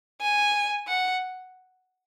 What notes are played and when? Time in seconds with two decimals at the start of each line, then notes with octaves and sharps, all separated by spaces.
0.21 G#5
0.88 F#5